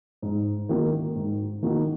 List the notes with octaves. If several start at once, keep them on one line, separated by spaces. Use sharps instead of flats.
G#2
D#3 A#3 D#4 F#4
G#2
D#3 A#3 D#4 F#4